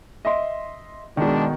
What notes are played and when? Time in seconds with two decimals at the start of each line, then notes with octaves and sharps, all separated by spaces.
0.25 D#5 E5 C6
1.17 B2 D#3 G#3 D4